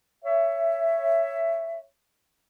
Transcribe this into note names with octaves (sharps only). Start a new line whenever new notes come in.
C#5 E5